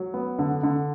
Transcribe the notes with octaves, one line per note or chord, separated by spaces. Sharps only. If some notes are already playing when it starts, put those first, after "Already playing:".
Already playing: F#3
B3
D3
D3